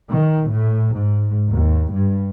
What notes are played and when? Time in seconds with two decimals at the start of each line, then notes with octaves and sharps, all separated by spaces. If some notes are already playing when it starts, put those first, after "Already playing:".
0.11 D#3
0.50 A2
0.94 G#2
1.52 D#2
1.93 G2